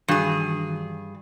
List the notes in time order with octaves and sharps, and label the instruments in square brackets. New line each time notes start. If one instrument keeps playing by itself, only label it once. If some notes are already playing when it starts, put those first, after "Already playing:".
[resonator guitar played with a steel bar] G2 G#4 [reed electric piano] D#3 E3 F#4